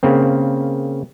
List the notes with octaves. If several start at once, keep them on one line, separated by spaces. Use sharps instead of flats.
C#3 A#3 C4